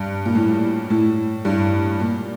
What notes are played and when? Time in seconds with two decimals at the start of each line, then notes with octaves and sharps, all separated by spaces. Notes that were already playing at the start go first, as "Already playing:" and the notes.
Already playing: G2
0.25 A#2
0.35 A2
0.90 A2
1.45 G2
1.99 A#2